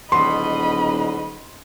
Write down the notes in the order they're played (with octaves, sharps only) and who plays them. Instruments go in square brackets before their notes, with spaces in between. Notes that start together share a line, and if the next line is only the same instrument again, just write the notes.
[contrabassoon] D#1 [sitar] E2 B2 [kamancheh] D#5 B5 [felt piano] C6